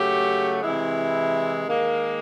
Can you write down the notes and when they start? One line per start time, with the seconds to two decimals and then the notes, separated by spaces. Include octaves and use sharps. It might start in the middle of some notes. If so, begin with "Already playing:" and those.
Already playing: C#3 F#3 A3 G4
0.63 C3 E3 G#3 E4
1.68 D#3 G#3 A#3